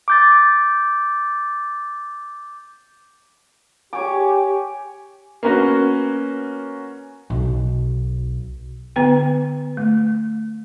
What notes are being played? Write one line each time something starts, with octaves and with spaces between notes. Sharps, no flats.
D6 G6 A6
G4 C#5 G#5 D6
A#3 B3 C#4 F#4
B1
D3 B3 B4 G5
A3